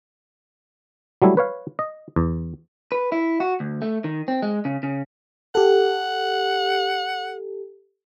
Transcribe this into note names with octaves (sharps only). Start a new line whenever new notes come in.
F#3 G3 A3 E4
B4 C#5 F5
D#5
E2
B4
E4
F#4
D2
A3
D#3
C4
G#3
C#3
C#3
G4 A4 F#5